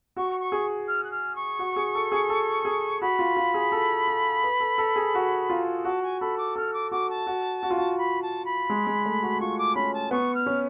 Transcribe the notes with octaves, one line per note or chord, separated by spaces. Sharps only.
F#4 C#6
C#6
G#4
F6
F#6
F6
C#6
F#4
G#4
A4
G#4
A4
G#4
F#4 B5
F4
F4
G#4
A4
A4
B4
A4
A4
G#4
F#4
F4
F#4 A5
G#5
A4 B5
D6
A4 F6
D6
F#4 D6
A5
F#4
F#4
F4
F#4
B5
A5
B5
G#3
G#3
A3
F#4
F4 C#6
D6
C#4 B5
A5
B3 C#6
F6
C#4